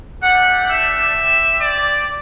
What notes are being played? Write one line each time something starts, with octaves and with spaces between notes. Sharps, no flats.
A3 D4 G4 F#5
E5
C4 G4
D5